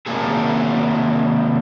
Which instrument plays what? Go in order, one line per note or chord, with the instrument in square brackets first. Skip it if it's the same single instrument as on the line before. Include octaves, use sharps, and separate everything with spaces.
[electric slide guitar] C3 D#3 F#3 A#3 G#4 A4